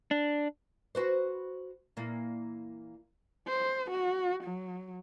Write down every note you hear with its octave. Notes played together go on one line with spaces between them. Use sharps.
D4
F#4 B4 C5
A#2 E3 A#3
C5
F#4
F#3